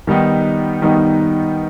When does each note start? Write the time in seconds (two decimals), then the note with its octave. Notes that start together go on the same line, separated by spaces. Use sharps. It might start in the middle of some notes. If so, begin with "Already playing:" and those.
0.07 D#3 G3 B3 D#4
0.82 D#3 G3 B3 D#4